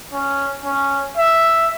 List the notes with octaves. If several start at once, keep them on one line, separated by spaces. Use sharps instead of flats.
C#4
C#4
E5